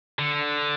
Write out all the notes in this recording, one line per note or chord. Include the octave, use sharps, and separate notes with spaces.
D3